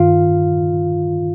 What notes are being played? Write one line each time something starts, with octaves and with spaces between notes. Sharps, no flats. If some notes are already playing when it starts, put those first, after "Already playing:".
Already playing: G2 D#3 F4 F5